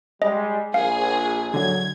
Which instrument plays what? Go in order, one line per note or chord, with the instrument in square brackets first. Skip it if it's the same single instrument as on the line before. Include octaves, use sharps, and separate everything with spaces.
[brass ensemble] G3 G#3 [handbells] D#5
[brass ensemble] A#1 [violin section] G#4 [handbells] F5
[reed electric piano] D3 F#3 [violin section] G#6